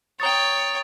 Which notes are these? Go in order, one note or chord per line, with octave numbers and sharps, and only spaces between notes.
C#5 G5 A#5 D#6 A6